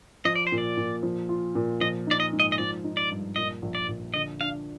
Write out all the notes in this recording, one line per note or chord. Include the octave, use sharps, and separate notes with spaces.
F3 D#5
D5
C5
A#2
D5
A#2
F3
F4
A#2
F3 D#5
D#4 D5
D#5
G#2
D#5
D#5
F3 D5
D#4
D5
G2
A#2 D#5
A#1
D5
A#1
D3 D#5
D4 F5